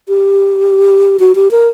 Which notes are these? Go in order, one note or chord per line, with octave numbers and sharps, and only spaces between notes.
G4
F#4
G4
A#4